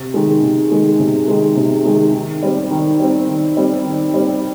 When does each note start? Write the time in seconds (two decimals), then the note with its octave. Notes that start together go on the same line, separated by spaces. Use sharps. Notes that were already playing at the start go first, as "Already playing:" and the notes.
Already playing: C3
0.14 D#3 G#3
0.43 C3
0.71 D#3 G#3
0.99 C3
1.28 D#3 G#3
1.57 C3
1.86 D#3 G#3
2.14 D#3
2.43 G3 C4
2.71 D#3
3.00 G3 C4
3.28 D#3
3.57 G3 C4
3.85 D#3
4.14 G3 C4